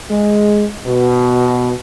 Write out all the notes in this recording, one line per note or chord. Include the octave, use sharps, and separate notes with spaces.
G#3
B2